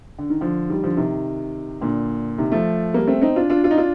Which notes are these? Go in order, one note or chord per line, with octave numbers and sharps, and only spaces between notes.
D3
D#3
D3 F3
D#3 G3
D3 F3
C3 D#3
A#2 D3
C3 D#3
F3 A3
G3 A#3
A3 C4
C4 D#4
D4 F4
D4 F4
D4 F4
D#4
D4 F4